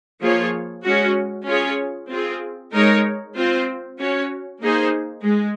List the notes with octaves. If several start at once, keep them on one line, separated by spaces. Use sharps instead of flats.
F3 A#3 F4 G#4 C#5
G#3 C#4 F#4
C#4 F4 G#4 C#5
C4 F4 G#4
G#3 D#4 A#4 C#5
C4 F4 C5
C#4 F#4 C#5
A#3 D#4 G#4 C5
G#3